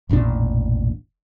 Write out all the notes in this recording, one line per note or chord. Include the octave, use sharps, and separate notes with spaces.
E1 A1 A#2 D4